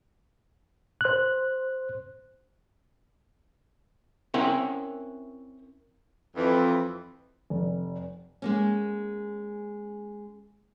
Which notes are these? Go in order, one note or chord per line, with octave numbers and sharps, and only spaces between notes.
C5 F#6
C4 C#4 E4 A#4 E5 F#5
F2 E3
F1
G#3 A#3 C#4